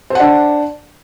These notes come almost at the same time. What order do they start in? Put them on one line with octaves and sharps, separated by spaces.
C5 F#5 D4